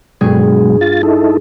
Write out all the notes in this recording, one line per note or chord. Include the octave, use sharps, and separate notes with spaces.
G2 B2 F#3 G#3 G#4
F4 A6
D#4 E4 A4